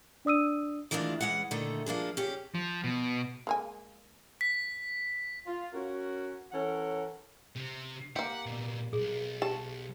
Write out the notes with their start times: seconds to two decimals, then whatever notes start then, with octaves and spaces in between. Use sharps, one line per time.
0.25 D4 D5 D#6 E6 D#7
0.91 D#3 E3 G#3 A3 D4 F4
1.21 E3 G#3 C#4 F#5
1.51 A#2 D3 D#3 A3
1.86 F3 A#3 D4 G#4
2.17 C#4 D4 G4 G#4
2.55 F3
2.84 B2
3.47 G#3 A#3 G#5
4.41 B6
5.46 F4
5.74 C#4 F#4 A#4
6.52 E3 C#4 A4 A#4 C#5 F#5
7.56 C3 C4
8.16 A#3 G4 F#5
8.46 A#2 B3
8.93 B1 A#2 G#4
9.42 G4 A5